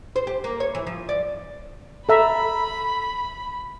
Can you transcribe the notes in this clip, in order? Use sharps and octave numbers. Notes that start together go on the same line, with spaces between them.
C5
G4
A#3
C#5
E3
F3
D5
A4 E5 A#5 B5